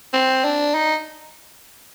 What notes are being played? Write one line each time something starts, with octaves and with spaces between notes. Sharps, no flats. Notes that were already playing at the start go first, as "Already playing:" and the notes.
C4
D4
D#4